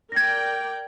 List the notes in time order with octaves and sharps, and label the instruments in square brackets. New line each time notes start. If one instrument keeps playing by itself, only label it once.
[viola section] A#4 D5 G5 [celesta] G#6 A#6